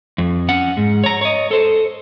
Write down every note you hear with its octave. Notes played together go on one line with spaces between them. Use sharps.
F2
C#4 F#5
G#2
C#5 A#5
C#5 D#5
A4 C5